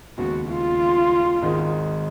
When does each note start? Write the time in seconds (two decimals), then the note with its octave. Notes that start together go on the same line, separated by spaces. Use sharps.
0.17 D#2 C#3 G#3 B3 F#4
0.49 F4
1.42 G#1 G#2 D#3 G#3 D#4